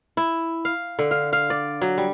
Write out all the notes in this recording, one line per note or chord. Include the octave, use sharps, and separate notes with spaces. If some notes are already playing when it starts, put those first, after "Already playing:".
E4
F5
D3
F5
F5
D5
F#3
G3